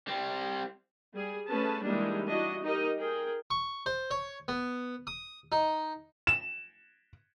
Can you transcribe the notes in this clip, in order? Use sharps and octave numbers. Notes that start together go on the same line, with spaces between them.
G3 C4
G3 G#4
A3 C#4 G#4 B4 A5
E3 G3 G#3 A#3 D4 D#4
D4 E4 F#4 D#5
D#4 G4 A#4 D#5
G#4 A#4 G5
C#6
C5
C#5
B3
D#6
D#4
E7